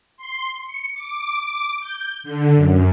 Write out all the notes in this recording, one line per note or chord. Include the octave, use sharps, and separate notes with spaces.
C6
C#7
D6
D6
G6
D3
F#2